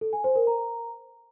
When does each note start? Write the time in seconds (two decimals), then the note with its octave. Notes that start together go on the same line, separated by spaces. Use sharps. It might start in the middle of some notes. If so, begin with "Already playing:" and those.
0.01 A4
0.13 G#5
0.24 C5
0.36 A#4
0.47 A#5